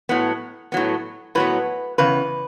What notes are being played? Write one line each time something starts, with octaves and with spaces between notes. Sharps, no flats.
A2 F#3 B3
A2 F#3 B3
A2 F#3 B3 B4
E2 C#3 B4